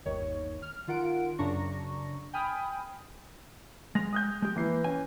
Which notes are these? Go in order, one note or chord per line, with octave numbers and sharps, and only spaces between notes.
G1 D#2 D#3 C#5
F6
D#3 F4 A#4 F#5 D7
F#2 C#3 D4 A#5 C#6 A#6
G5 G#5 B5 D#6 F6
G#3 A#6 F7
D#6 F#6 G6
G#3 G4
E3 A#3 B4 C7
C#4 G#5